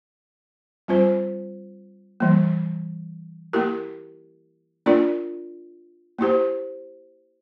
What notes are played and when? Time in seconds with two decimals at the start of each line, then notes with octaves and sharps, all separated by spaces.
0.88 G3 C4 F4 C5
2.20 E3 G3 A#3
3.53 A#3 E4 G4 A#4
4.86 A#3 D4 F4 A#4 D5
6.19 A#3 E4 G4 C5